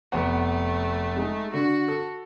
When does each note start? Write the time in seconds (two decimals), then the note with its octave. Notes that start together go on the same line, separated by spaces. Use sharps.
0.12 F1 A3 B3 F#5
1.16 G#3 D#4
1.53 D3 F#4
1.88 A4